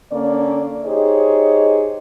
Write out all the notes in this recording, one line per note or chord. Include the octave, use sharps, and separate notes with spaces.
D3 A#3 C#4 D5
D#4 G4 G#4 C5 C#5 D#5